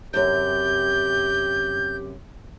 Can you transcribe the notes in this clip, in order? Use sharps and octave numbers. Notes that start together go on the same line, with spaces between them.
F#2 C3 G4 G6